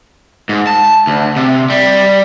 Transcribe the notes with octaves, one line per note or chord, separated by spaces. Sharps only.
G#2
A5
D2
C3
G3